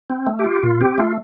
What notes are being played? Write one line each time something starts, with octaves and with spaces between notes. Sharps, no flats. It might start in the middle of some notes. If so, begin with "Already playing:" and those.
C4
A3
G4
F4
A#2 F4
C4 G4
A3 F4